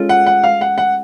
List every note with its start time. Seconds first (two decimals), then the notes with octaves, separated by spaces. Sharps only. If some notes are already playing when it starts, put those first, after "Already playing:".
Already playing: G#3 C#4 F4 A4
0.09 F#5
0.26 F#5
0.44 F5
0.61 F#5
0.78 F#5